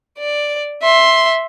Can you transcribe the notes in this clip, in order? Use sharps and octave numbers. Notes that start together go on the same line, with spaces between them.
D5
E5 C6